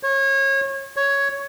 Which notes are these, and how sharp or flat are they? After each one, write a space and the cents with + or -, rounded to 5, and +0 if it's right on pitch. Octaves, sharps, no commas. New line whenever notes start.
C#5 -30
C#5 +5